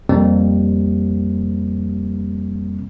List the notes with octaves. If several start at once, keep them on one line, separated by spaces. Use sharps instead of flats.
F2 C3 G3 A#3 C4